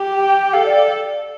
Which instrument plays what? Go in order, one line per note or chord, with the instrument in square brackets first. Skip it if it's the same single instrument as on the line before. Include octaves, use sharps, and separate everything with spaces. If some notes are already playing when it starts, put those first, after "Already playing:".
Already playing: [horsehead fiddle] G4
[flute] G5
[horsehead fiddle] A4 [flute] F5
[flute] D5